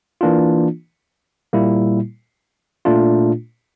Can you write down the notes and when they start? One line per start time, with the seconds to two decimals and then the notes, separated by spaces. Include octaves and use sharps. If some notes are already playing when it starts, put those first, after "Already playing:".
0.21 E3 A#3 D4 F4
1.53 A#2 G3 A#3 E4
2.85 A#2 A3 D4 F4